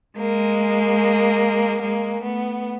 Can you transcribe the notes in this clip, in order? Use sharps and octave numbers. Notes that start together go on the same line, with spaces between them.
G#3 A#3
G#3 A#3
A3 B3